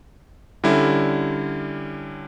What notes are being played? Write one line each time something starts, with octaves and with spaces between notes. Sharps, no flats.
D3 G3 C#4 E4